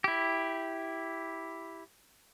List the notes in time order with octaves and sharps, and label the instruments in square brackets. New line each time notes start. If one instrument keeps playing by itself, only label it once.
[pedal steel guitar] E4 G4